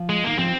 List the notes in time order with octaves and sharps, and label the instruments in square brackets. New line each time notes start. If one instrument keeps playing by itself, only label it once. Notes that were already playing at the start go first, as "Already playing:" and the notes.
Already playing: [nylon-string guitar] F3
[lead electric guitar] G#3
[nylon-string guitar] D#3 [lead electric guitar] A#3
[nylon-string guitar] F3 [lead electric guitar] C4